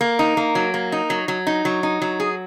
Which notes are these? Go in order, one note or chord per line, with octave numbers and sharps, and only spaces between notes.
A#3
D#4
A#3
F#3
A#3
D#4
F#3
F#3
D#4
F#3
D#4
F#3
G#4